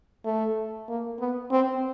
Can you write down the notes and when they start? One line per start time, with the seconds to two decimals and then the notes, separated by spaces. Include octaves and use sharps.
0.25 A3
0.88 A#3
1.19 B3
1.51 C4